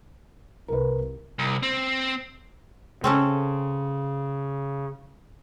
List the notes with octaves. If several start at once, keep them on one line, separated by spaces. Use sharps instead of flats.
C2 A#4 B4
C2
C4
C#3 C4 C#4 A4